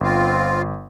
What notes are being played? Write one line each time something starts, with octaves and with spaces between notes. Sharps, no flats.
G1 C4 F4